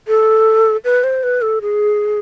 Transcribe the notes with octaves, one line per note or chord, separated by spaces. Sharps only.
A4
B4
C5
B4
A4
G#4